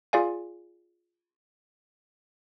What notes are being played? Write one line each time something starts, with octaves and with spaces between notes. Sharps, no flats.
F4 G#4 D5 F5 G#5